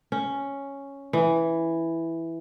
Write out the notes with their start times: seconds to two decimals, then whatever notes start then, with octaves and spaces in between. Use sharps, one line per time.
0.12 C#4
1.13 E3